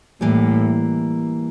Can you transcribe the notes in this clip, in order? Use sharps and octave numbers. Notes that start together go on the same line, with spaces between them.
A2 E3 G3 A#3